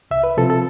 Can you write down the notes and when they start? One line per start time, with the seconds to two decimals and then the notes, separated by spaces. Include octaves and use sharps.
0.11 C2 E5
0.24 B4
0.37 C3 F3 C4 F4 A4
0.50 A4